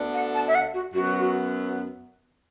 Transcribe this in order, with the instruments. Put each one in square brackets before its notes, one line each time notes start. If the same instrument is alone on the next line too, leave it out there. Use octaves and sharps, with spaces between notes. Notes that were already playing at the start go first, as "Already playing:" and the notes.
Already playing: [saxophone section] D2 D3 B3 D4 A4
[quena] F#5
A5
E5
F#5
F#4
[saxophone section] F#2 F#3 B3 [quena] F#4